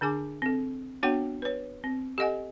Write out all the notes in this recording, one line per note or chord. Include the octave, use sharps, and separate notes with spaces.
D3 D4 G#4 G#5 D6
C4 A4
B3 D4 F#4 C#5 F#5 G5
B4 C#5
C4
G4 A4 D#5 F#5 G#5